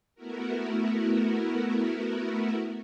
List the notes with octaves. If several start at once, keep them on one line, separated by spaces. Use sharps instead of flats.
A3 B3 E4 F#4 A#4